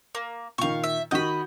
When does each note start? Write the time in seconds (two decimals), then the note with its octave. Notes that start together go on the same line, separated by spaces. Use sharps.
0.15 A#3
0.58 A#2 D#3 F5 C#6
0.84 E5
1.11 D#3 F#4 D#5 B5 G6